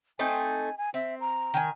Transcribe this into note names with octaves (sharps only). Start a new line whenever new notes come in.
A3 C4 D#4 G#5
G#5
C4 E5
A#5
D#3 G#5